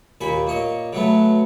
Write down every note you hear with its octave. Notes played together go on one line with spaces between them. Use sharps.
D#2 A#2 G#5 B5
A#2 C#5 D#5
C#3 F#3 A3 B3